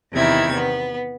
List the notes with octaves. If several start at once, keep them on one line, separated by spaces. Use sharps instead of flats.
E2 C3 D#3 E4 G#6
B3